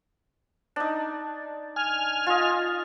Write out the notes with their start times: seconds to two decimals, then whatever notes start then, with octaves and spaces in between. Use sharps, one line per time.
0.76 D4 D#4
1.76 G#5 F6
2.26 F4 D#5